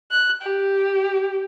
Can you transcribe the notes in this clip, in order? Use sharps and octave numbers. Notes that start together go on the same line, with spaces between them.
F#6
G4